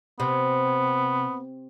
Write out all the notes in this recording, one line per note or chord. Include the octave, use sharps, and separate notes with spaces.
C3 B3